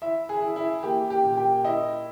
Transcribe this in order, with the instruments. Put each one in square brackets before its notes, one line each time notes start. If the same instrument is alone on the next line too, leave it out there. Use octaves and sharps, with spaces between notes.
[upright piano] E4 E5
G#4
E4
E4
A#3 G4
G4
A#2
G4
E4 D#5